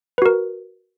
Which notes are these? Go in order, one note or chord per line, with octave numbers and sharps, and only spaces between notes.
F#4 A#4 B4